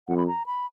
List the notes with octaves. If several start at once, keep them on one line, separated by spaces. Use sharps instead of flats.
F2 F#5
B5
A#5
B5